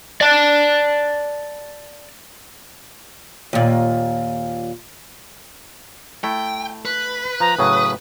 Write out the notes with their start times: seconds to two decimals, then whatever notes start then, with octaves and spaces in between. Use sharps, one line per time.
0.21 D5 A5
3.53 D#2 A#2
6.24 A3 E4 G5
6.85 B4
7.40 F3 A#5
7.59 A2 C#3 F#3 D#6